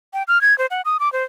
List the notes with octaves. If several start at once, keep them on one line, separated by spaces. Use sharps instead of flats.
G5
F6
G#6
C5
F#5
D#6
D6
C5